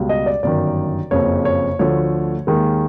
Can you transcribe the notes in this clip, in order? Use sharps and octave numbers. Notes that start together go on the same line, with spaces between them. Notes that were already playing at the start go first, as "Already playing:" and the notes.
Already playing: C#2 B2 G3
D#5
D5
G1 F#2 D#3 D5
F#1 F2 C#3 C#5
C#5
D2 D3 F3 A3 C#5
D#2 D#3 G#3